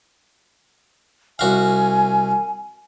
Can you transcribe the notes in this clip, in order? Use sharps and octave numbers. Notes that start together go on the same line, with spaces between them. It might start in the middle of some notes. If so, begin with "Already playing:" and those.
C2 F#4 F5 G#5